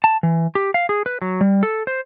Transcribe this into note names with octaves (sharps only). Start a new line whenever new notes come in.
A5
E3
G4
F5
G#4
B4
F#3
G3
A4
C5